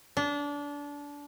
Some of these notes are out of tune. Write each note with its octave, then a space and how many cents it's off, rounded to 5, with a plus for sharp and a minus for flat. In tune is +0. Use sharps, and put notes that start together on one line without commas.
D4 -25